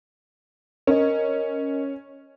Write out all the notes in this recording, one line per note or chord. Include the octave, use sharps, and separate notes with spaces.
C#4 A#4 D#5